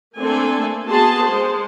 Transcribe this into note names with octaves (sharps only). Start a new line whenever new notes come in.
A3 A#3 C4 D4 A4 G#5
B3 F#4 G#4 A5 C6
G#3 C5